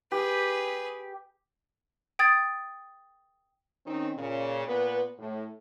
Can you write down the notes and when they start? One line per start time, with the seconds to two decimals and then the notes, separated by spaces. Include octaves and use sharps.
0.12 G4 G#4 B4
2.19 G5 D#6 G#6 A6
3.85 D#3 C4 C#4 D#4
4.17 A#2 C#3
4.67 A#2 B3 B4
5.19 A2